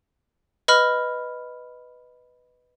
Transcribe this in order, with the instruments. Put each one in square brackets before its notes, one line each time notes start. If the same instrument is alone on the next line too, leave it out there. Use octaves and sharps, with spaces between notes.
[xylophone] B4 D#5 B5 F6